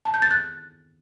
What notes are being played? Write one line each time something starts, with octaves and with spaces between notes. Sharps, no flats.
A5
G6
A6
F#6